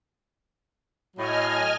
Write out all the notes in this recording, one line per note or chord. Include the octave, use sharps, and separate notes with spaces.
A2 F#3 D#5 G#5 F6